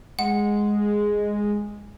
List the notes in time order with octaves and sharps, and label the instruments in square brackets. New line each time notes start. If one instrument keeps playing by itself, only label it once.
[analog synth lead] G#3 [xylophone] F#5